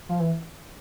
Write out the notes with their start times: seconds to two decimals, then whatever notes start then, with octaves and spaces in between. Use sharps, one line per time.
0.09 F3
0.20 E3